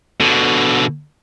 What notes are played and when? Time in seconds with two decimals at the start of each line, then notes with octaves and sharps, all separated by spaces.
0.20 B2 D3